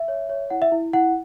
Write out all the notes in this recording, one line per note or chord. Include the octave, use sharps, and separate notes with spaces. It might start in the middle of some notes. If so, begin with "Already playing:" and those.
Already playing: E5
C#5
C#5
E4 F#5
E5
E4
E4 F#5